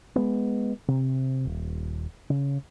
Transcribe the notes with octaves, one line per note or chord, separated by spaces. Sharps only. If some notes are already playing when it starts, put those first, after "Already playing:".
G#3 B3
C3
D#1
C#3